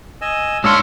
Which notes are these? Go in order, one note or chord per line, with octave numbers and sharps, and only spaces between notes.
D#5 G#5 E6
G#2 D4 F4 C#5 C6 E6 C#7 D7